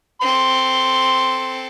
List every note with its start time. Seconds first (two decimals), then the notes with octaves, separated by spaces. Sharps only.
0.21 C4 A4 C6